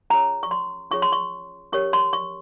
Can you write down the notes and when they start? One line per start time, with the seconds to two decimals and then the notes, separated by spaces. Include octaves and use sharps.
0.10 C#4 F4 G#4 C#5 A#5
0.43 C#6
0.51 C6
0.91 C#4 F4 G#4 C#5 C#6
1.02 C6
1.12 C#6
1.72 C#4 G4 A#4 C#5 C#6
1.93 C6
2.13 C#6